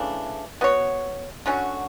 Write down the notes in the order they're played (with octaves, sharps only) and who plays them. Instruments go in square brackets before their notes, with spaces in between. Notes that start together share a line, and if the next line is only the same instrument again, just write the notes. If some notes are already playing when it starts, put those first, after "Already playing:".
Already playing: [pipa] C#3 E3 A3 D4
B3 F#4 C#5
D3 F#3 C#4 F#4